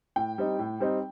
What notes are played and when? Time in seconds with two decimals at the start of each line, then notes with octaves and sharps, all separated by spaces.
0.16 A2 G5
0.38 G3 C4 D#4
0.59 A2
0.80 G3 C4 D#4